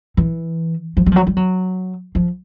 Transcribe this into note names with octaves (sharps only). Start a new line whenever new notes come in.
E3
F3
G3
F3
F#3
G3
F#3
F3